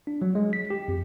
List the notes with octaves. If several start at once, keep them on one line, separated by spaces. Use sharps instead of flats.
D4
F#3
G#3
B6
G4
F2